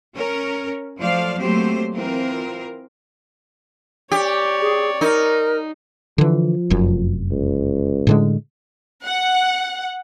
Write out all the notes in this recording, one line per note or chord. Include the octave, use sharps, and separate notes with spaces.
C#4 A#4
F3 F#3 A3 C5 D5 F5
F#3 A3 A#3 C4 G4 C5
E3 C4 F4 A#4
G4 C#5 D5
G#4
D#4 A#4
D3 E3 F3
F1 F#2
C#2
A2 D3 G#3
F#5